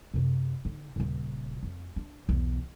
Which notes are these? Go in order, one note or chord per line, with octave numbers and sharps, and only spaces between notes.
F#2 C3
D3 D#4
D#1 C#3
F2
D4
B1 E2